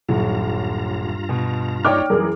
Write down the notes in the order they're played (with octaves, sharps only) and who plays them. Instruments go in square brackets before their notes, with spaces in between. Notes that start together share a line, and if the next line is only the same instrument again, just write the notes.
[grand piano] D#1 F#3 [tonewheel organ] G2 F4 A#5
[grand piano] B2
[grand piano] D#4 C#5 D5 [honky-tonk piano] G5 D6 F6
[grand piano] F#2 E3 [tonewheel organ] G3 D#4 [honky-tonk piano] G#4 A#4